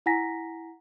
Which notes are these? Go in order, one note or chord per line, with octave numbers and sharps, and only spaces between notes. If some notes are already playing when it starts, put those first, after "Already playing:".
E4 F#5 G#5 A#5 A#6 B6